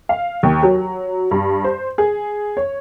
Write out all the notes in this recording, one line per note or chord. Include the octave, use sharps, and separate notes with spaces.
F5
D#2
F#3
G2
C5
G#4
C#5